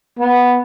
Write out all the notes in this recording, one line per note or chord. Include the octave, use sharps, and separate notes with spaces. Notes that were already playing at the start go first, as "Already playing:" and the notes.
B3